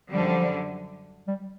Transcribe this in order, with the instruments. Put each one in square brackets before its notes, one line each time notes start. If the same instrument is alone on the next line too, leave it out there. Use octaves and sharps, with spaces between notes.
[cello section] F#2 D3 G3 [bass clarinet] F3
[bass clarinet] G3